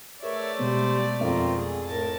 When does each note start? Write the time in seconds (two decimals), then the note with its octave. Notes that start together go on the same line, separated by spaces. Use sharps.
0.23 A3 G#4 A#4 B4 C#5 D5 E5
0.59 B2 G3 G#3 B3 C5
1.21 F2 C4 F4 A#4
1.55 G#4
1.86 A2 A#4 A5